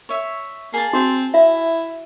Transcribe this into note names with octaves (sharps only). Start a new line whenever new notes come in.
C#5 E5
A#3 G#4 A5
C4 F#4
E4 E5